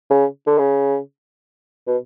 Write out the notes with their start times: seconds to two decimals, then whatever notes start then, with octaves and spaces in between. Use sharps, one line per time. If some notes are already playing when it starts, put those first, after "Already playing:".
0.10 C#3
0.46 D3
0.58 C#3
1.87 B2